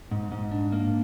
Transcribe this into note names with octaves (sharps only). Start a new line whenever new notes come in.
G#2
G#2
D4
A#3